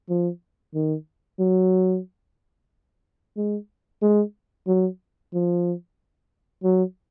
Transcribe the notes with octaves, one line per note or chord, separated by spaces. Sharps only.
F3
D#3
F#3
G#3
G#3
F#3
F3
F#3